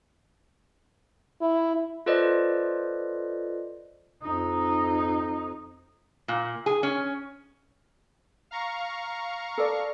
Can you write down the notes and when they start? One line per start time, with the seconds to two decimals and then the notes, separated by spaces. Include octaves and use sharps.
1.41 E4
2.06 F4 A4 B4 C5 D5 D#5
4.22 F2 D#4
6.28 A#2
6.66 G#4
6.83 C#4
8.51 F5 A#5 C#6
9.58 A4 D5